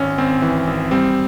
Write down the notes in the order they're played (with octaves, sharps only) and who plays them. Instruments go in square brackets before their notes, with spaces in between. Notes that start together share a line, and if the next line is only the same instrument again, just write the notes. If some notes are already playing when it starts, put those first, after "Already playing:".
Already playing: [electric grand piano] G#1 C#4
G#1 C4
E3
G#1
G3 C4